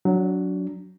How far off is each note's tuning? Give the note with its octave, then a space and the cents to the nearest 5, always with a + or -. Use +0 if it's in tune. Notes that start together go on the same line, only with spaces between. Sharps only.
F#3 +0 D4 -25